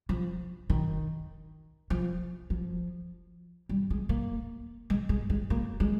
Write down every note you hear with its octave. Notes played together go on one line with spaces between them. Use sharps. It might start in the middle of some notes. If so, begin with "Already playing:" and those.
F3
D#3
F3
F3
G3
G#3
A#3
G#3
G#3
G#3
A#3
G#3